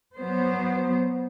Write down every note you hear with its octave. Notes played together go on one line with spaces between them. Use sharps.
F#3 B3 C5